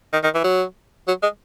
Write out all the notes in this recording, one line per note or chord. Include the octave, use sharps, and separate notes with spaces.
D#3
D#3
E3
F#3
F#3
G#3